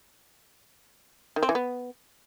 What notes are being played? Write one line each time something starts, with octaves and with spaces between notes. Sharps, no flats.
D#3
C4
E3
B3